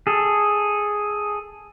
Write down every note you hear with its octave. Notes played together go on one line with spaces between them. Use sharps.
G#4 A4